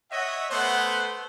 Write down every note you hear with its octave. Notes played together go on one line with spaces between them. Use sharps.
C#5 D#5 E5 F#5
A3 B3 C5 F#5